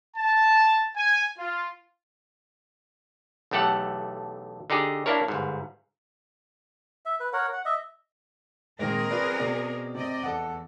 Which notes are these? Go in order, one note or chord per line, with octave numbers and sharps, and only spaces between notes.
A5
G#5
F4
B1 E2 A3 G4 A4 F#5
D3 D#4 G4 G#4
A#3 D4 E4 A#4 C#5
G1 G#2
E5
B4
A#4 C#5 F#5
F#5
D#5 E5
A#2 D#3 G#3 C4 G#4 A#4
F4 B4 D5
B2 D5
C3 D5 D#5
E2 A4 F#5